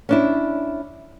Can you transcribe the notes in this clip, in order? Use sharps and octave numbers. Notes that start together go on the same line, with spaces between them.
C#4 D4 E4